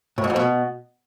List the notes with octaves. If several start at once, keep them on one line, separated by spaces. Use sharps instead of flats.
A2
G#2
F2
B2